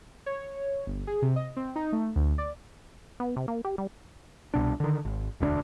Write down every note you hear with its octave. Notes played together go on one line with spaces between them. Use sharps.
C#5
G1
G#4
C3
D#5
C4
D#4
A3
D2
D5
B3
C3
A#3
G4
G3
C2 B2 D4
D3 D#3
G#1
E1 D2 B3 D4